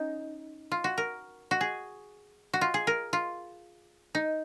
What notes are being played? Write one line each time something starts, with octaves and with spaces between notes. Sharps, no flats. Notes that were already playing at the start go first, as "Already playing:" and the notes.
Already playing: C#4 D#4
F4
F#4
A#4
F#4
G#4
F#4
F4
G#4
A#4
F4
D#4